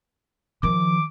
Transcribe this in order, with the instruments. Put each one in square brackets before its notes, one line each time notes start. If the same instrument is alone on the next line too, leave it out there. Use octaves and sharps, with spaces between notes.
[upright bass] D#3 F3 [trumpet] D6